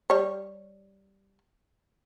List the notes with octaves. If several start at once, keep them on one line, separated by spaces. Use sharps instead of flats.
G3 C#5